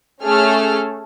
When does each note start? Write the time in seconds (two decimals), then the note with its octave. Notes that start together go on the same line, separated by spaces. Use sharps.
0.23 A3 C#4 G#4 A4 F6